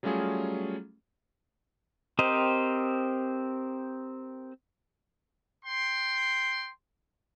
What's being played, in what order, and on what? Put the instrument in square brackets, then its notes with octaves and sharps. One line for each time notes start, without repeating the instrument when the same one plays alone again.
[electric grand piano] F#3 G3 A3 C#4 F4 G#4
[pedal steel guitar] C4 G4 A#4 C5 D#5
[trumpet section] G5 C6